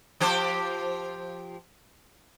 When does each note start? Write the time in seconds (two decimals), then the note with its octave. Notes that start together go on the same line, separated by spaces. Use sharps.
0.20 F3 G4 C5